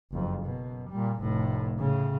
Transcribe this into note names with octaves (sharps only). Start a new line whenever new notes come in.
F#1 F2
F#2 B2
A#2 G3
F1 A2
A2 C#3